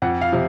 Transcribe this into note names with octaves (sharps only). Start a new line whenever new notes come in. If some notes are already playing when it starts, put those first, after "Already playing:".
F2 F#5
F5
C3 F3